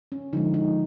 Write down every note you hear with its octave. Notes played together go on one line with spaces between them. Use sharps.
C#4
D3 F3 G#3 D#4
D#4